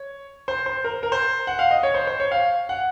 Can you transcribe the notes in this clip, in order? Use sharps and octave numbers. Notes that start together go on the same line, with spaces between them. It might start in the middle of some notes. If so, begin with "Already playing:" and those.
Already playing: C#5
C5
C5
A#4
A#4
C5
F#5
F5
D#5
C#5
C5
C5
C#5
F5
F#5